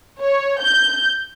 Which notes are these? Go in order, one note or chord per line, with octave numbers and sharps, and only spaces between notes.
C#5
G6